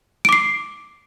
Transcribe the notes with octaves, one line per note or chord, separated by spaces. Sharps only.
D6 C7 D7